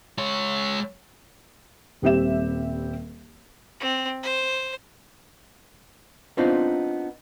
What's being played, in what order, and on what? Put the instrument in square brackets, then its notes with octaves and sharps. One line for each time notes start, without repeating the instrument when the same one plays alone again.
[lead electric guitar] G#3 C#5
[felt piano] D#1 G3 C4 G4 E5 E7
[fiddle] C4
C5
[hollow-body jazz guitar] B3 C4 D4 D#4 F4 C5